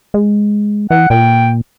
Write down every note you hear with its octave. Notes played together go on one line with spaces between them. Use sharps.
G#3
E3 F#5
A#2 G5